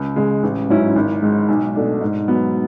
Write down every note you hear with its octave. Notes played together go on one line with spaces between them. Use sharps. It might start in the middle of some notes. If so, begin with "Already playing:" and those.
Already playing: C#2
C#3 G#3
A1
G#2 F#3 C#4 E4
G#1
G#2 G#3
B1
B2 A3 D4
G#2
F#3 B3